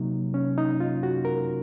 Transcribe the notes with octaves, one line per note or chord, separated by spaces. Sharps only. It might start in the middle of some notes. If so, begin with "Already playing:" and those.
Already playing: C3 F#3 A#3 D#4
C#4
D#4
F4
F#4
A#4